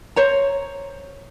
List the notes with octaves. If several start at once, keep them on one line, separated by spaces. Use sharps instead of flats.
C5 C#5 A#5